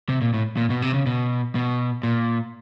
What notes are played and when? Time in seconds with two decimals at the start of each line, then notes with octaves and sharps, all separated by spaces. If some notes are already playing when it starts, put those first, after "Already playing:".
0.09 C3
0.21 A#2
0.34 A2
0.57 A#2
0.70 B2
0.82 C3
0.94 C#3
1.06 B2
1.55 B2
2.03 A#2